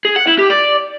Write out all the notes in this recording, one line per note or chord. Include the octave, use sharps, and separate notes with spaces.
G#4
F#5
E4
G4
D5